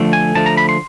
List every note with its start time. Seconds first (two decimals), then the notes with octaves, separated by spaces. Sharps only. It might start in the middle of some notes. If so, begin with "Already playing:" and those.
Already playing: D3 F3 A3
0.13 G#5
0.35 D3 F3 A3 A5
0.46 A#5
0.57 B5
0.69 C6